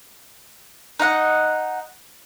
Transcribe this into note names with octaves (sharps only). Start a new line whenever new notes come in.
D#4 D#5 F5 F#5